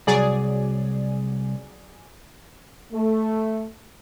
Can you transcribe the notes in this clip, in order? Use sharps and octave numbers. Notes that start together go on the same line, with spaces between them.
C2 F#3 G#4 D5
A3